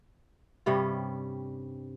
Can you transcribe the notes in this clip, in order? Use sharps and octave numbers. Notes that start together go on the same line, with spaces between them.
G2 C3 G3 C#4